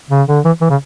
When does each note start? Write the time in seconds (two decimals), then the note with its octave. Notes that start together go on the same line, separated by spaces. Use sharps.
0.10 C#3
0.28 D3
0.45 E3
0.61 E3
0.70 C#3